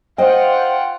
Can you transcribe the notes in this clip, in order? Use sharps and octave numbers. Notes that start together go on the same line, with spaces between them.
F4 C5 D#5 F#5 G5